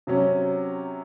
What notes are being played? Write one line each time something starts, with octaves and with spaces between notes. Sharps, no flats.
C3 F#3 C#4